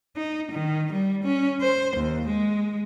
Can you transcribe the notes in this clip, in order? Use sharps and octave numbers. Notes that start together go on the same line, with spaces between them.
D#4
D#3
G3
C#4
C5
D#2
G#3